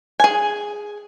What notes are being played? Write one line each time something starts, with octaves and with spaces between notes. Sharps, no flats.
G#4 G#5